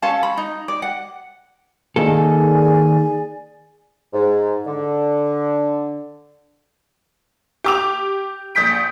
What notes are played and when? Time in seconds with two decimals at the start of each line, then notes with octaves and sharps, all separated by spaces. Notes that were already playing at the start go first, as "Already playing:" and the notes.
0.02 C#4 A4 F5 A5
0.23 B5
0.37 D#4
0.68 D5
0.82 F#5
1.96 D#3 A#3 G#4 A4 D5 G#5
4.13 G#2
4.66 D3
7.64 G4 D6 F7
8.55 A#1 D#6 G6 B6 D7